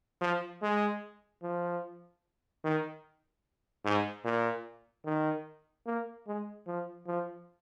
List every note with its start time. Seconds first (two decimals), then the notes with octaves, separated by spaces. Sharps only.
0.21 F3
0.62 G#3
1.43 F3
2.64 D#3
3.85 G#2
4.25 A#2
5.05 D#3
5.86 A#3
6.27 G#3
6.67 F3
7.07 F3